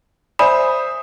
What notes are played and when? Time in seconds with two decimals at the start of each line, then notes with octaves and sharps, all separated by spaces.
0.39 C5 D5 E5 G#5 B5 D#6